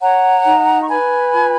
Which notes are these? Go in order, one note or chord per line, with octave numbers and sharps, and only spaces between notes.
C#5 F#5 A#5
D#4
C#6
B4 G#5 B5
F4